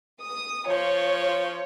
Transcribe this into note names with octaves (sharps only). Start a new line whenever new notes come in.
D#6
F3 F4 C#5